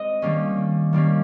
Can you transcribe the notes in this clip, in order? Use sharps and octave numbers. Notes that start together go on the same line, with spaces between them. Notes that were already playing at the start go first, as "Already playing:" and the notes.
Already playing: G#3 C4 D#5
D#3 G3 A#3 C#4
D#3 G3 A#3 C#4